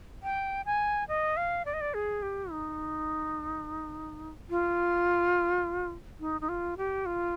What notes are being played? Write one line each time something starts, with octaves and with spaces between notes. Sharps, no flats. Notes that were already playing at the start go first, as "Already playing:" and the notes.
G5
G#5
D#5
F5
D5
D#5
D5
G#4
G4
D#4
F4
D#4
D#4
F4
G4
F4